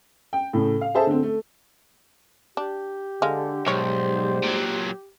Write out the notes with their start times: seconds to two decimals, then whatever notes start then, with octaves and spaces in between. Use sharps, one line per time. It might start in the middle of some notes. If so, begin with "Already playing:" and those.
0.33 G5
0.53 A2 C#3 A3
0.81 F5
0.95 G#4 A4 C5 E5 A5
1.07 D3 A3 C4
1.23 A3
2.57 D4 G4
3.22 D3 G#3 F5
3.66 B1 G#2 D#3 G3 C5 C#5
4.44 A#2 F#3